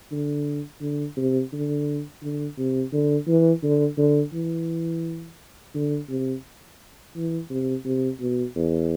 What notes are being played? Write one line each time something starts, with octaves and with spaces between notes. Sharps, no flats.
D3
D3
C3
D3
D3
C3
D3
E3
D3
D3
E3
D3
C3
E3
C3
C3
B2
E2